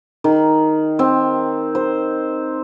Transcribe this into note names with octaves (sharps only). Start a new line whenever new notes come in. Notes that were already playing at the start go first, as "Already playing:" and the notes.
D#3
C4
C5